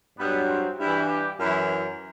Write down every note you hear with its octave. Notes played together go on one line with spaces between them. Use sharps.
G2 F#3 B3
C4
G2 E3 E4
G4
F#2 E3 E4